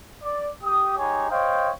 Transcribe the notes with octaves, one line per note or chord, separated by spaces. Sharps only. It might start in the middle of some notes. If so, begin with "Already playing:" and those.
D5
G4 D#6
G#3 D#4 G4 G#4 C#5
C5 C#5 D#5 F5 G5